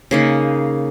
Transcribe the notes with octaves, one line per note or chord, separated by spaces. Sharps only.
C#3 A#3 D#4